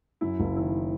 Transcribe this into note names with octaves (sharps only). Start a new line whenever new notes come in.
F#2 E4
F#1
D#3 E4